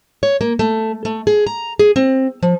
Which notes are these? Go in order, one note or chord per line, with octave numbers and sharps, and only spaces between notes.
C#5
A#3
A3
A3
G#4
A#5
G#4
C4
F3